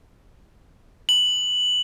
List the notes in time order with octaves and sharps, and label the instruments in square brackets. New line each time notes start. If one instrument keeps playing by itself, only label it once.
[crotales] F#7